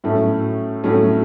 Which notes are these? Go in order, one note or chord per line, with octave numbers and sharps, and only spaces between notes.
A2 F#3 A3 C#4
A2 F#3 A3 C#4